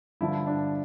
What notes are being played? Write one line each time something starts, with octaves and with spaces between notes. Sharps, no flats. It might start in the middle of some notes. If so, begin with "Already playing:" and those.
G2 D3 F3 E4
D4